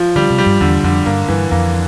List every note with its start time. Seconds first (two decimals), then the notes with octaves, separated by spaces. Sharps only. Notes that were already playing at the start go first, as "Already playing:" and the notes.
Already playing: F3
0.16 D3 G3
0.31 C3
0.39 G3
0.46 G2
0.61 E2 D3
0.84 F2 D3
1.06 G2 A#3
1.28 G2 E3
1.51 F2 A#3